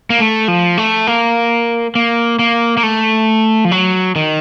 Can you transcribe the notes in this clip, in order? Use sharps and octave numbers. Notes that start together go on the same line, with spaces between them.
A#3
A3
F3
A3
A#3
A#3
A#3
A#3
A3
F3
F#3
D#3